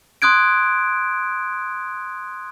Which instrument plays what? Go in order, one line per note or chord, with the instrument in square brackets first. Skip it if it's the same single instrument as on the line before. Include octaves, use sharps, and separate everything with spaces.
[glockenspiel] C6 D#6 F#6 G#6 D7